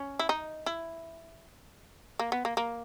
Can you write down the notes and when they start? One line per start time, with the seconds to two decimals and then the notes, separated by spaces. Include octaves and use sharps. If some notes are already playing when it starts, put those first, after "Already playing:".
Already playing: C#4
0.19 E4
0.29 D#4
0.66 E4
2.19 A#3
2.32 B3
2.45 A#3
2.57 A#3